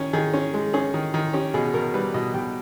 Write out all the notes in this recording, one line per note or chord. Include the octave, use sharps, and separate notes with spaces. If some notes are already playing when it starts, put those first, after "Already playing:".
Already playing: D#3 C#4
D#3 G#4
C#4
G#3
C#4 G#4
D#3
D#3
C#4 G4
B2 G#4
B2 A#4
G3 B4
B2 D#5
B2 G5